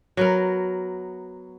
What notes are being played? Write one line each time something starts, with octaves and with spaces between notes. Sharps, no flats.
F#3 B3 A#4